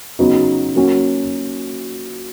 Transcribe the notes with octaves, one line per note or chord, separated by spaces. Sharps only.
C#3 F#3 B3 D#4 F#4
F#3 A#3 C#4 F#4